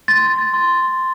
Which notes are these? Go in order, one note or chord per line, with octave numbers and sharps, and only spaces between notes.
C6 A6
C6